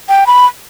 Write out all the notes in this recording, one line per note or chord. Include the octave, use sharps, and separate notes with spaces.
G5
B5